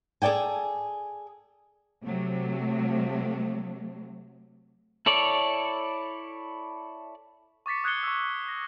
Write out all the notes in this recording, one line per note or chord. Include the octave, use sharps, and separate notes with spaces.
G#4 A4 D5 G5 G#5
C3 F#3 A3
E4 A4 C#5 D5
C#6 D6 A6 B6 C#7
D#6 F#6 G#6 C7 C#7 G7
C#6 E6
A#6